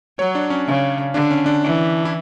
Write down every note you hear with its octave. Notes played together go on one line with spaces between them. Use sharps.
F#3 C#5
D4
C#4
C#3
D3 D4
C#4
D4
E3
E4